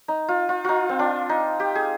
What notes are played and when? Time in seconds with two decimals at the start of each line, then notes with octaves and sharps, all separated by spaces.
0.08 D#4
0.28 F4
0.49 F4
0.64 D#4 F4
0.89 C4
0.99 D4
1.29 D#4
1.60 G4
1.75 G#4